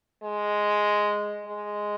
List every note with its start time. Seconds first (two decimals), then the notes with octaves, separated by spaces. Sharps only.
0.23 G#3
1.46 G#3